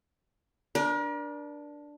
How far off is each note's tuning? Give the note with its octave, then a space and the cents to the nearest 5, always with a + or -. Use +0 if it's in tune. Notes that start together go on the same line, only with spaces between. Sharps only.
D4 +0 A#4 +40